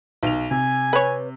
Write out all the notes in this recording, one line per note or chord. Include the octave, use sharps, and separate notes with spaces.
B1 F7
C3 G#5
B4 C#5